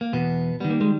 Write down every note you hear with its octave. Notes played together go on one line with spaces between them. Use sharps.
A#3
E2 B2 B3
D#3 G3 B3
A#3
G#3